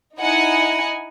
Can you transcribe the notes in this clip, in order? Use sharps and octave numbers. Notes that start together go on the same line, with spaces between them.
D#4 E4 D#5 F#5 G#5